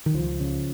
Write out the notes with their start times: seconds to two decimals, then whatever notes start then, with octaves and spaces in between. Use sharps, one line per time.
0.06 D#3
0.14 C#2 F3
0.40 C#3